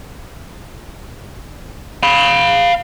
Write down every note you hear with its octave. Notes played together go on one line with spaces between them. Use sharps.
F5 B5